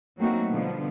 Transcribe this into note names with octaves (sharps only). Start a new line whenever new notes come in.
F#3 A3 A#3 C4 D#4 F#4
B2 D3 F3 G3 B3